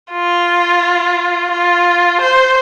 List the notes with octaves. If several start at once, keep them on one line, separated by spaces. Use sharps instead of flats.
F4
F4
C5